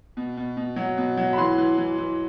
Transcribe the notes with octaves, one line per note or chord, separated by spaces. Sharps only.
B2
B2
B2
F#3
B2
F#3
B5
E3 C6
E3
E3
E3